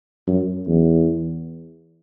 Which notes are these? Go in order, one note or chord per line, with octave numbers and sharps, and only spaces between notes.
F#2
E2